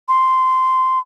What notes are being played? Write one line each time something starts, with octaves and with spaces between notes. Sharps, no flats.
C6